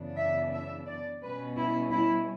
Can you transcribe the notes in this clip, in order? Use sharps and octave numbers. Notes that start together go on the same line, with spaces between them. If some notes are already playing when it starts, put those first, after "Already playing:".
Already playing: F#2 C#3 E3 B3 D4
E5
E5
D5
B2 G3 C#4 B4
E4
E4